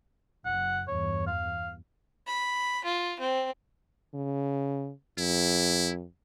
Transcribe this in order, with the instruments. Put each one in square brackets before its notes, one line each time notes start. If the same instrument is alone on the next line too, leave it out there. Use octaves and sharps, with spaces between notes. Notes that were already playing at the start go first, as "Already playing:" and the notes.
[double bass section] F#1 [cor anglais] F#5
[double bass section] E2 G2 [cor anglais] C#5
[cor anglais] F5
[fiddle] B5
F4
C4
[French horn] C#3
[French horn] F2 [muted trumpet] E4